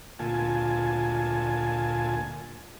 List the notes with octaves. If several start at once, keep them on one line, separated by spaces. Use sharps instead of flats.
D2 A#2 F4 G#5 A5